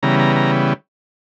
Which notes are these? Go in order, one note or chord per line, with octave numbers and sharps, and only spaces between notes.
C#3 E3 G3 B3 A#5
A#5
A#5